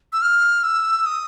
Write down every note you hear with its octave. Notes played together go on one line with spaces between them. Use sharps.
E6
F6
E6
D#6